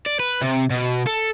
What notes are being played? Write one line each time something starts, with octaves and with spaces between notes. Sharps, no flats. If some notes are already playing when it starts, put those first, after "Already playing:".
D5
B4
C3
B2
A4